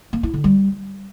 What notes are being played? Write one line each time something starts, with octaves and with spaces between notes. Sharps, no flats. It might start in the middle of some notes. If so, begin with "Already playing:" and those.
A#3
E4
D3
G3